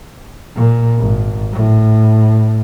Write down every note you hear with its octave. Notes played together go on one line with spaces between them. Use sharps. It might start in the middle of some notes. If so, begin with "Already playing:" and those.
A#2
G#1
A2